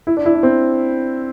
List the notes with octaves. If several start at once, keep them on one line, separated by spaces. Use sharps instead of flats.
E4
D4
E4
D4
C4